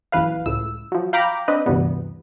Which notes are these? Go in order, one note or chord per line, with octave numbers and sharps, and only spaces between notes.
A#1 F#2 E3 B4 F5
C#2 A2 E6
F3 F#3
F5 G5 A#5 B5 D6
C4 D4 B4 D#5
D2 G2 C3 E3 G3 B3